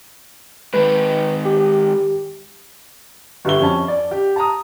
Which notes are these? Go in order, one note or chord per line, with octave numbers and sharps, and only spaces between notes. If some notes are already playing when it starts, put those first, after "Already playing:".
G#2 D#3 B4
G4
G1 F#4 G4 E5 G7
F2 C#4 A5
D5
G4
A5 A#5 D#6